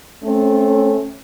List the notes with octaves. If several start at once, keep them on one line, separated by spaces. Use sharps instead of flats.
A3 C4 C#4